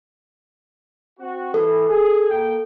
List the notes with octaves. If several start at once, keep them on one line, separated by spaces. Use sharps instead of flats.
C4 F#4
E3 A4
G#4
A#3 G5